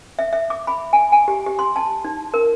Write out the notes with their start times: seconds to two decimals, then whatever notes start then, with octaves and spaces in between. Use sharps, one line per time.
0.19 E5
0.33 E5
0.50 D6
0.67 B5
0.93 G#5
1.12 G#5
1.28 G4
1.46 G4
1.59 C6
1.76 A5
2.05 D#4
2.34 A#4